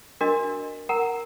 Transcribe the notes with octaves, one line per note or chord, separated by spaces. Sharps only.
D4 F#4 A#4 D#5
A#4 F#5 A#5